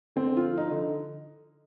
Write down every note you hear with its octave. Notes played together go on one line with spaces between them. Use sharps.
D3 C4
F4
F3
D#4
D3